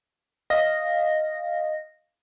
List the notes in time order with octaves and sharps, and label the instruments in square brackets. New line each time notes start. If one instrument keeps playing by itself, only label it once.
[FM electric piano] D#5 F5 A#6